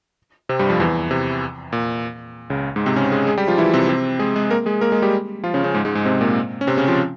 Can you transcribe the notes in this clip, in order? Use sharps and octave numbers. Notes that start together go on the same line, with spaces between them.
C3 C4
G2 G3
F2 F3
E2 E3
C3
A#2
C#2 C#3
G#2 G#3
C3 C4
C#3 C#4
G#3 G#4
G#3 G#4
G3 G4
F3 F4
E3 E4
C3 C4
C3 C4
G#3 G#4
G#3 G#4
A#3 A#4
G#3 G#4
A#3 A#4
G#3 G#4
G3 G4
F3 F4
C#3 C#4
C#3 C#4
G#2 G#3
G#2 G#3
G#2 G#3
C3 C4
A#2 A#3
C#4
C3 C4
C#3 C#4
F3 F4